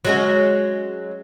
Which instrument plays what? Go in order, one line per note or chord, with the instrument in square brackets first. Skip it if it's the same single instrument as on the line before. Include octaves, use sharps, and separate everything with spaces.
[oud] F#3 G#3 C#4